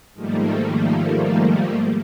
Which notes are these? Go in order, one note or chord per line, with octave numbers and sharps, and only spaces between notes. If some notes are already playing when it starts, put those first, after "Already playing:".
G#2 D#3 F3 G3 A3 A#3